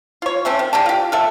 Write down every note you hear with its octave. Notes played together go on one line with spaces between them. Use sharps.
F4 C#5
A3 C4 C#4
D#3
D3 G4 G5 A5
F4 G4
F4 A4 E5